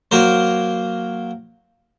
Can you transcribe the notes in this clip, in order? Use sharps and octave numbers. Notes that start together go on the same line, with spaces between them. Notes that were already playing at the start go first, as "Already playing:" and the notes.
F#3 A#3 A#4 C5